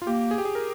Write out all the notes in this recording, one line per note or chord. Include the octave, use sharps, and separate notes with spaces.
F4
A#3 G4
G#4
G4
G#4
A#4